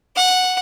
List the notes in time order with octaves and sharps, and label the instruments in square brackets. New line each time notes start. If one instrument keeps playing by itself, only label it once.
[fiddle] F#5